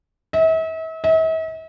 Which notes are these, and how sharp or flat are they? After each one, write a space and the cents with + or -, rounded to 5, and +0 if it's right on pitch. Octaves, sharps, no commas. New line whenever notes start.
E5 -40
E5 -45